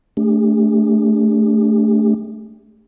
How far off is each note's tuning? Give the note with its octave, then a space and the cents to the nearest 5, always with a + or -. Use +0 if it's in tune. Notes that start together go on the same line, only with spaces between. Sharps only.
A3 -5 D4 -20 G4 +40